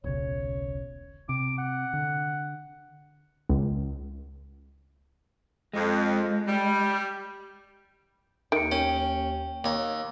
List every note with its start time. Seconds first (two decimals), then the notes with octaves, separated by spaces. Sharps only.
0.04 D#1 B1 C#3 C#5
1.29 C3 D6
1.58 F#5
1.93 D3
3.49 C#2
5.73 F2 G#3
6.47 G3
8.52 D#2 D#3 C#7 D7
8.72 C#4 G5
9.64 D#2 C#5